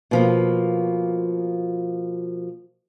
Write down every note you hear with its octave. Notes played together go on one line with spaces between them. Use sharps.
B2 F3 A#3